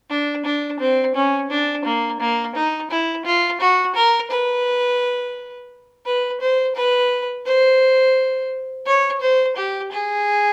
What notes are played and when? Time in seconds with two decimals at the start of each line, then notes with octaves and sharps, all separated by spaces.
0.10 D4
0.45 D4
0.80 C4
1.15 C#4
1.50 D4
1.85 A#3
2.20 A#3
2.55 D#4
2.90 E4
3.25 F4
3.60 F#4
3.95 A#4
4.30 B4
6.06 B4
6.41 C5
6.76 B4
7.45 C5
8.86 C#5
9.21 C5
9.56 G4
9.92 G#4